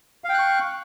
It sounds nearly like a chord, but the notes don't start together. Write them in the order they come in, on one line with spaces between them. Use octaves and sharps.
F5 G5 F#6 C#6